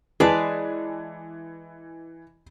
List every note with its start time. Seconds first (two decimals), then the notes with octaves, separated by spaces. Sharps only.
0.20 E3 G#3 G#4 B4 D5 A5